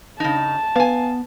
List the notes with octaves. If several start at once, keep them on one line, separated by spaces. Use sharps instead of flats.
C#3 D#4 A5
B3 B4 F5 G#5